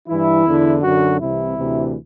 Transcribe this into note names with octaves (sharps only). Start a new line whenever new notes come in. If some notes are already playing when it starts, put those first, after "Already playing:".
G2 E3 E4
E2 D3
F#2 D3 F#4
C2 C3 E3 E4
D2 C3 E3